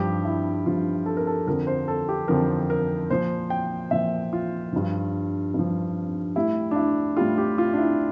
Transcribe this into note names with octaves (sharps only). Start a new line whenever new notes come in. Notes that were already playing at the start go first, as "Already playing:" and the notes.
Already playing: G2 F3 G4
E4
G2 F3 F4
A4
A#4
A4
F2 D3 F3 A#4
C5
A4
G4
F2 D3 F3 A#4
A#4
A#2 F3 C5
G5
A#2 F3 E5
F4
G2 F3
G2 F3
A2 G3 E4
D4
E4
A2 G3 F4
G4
F4
D4
E4